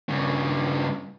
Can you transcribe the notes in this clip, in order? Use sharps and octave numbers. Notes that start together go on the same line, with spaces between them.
G2 C#3